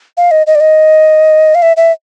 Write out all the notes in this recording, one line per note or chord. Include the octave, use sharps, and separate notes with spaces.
F5
D#5
D#5
D5
D#5
F5
E5
E5